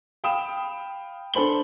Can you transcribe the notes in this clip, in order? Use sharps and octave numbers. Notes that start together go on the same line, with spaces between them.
F5 G5 B5 D#6 E7
D4 A4 C5 B5 F#7 G7